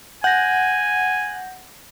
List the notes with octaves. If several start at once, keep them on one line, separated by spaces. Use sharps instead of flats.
F#5 G#5 G6 A#6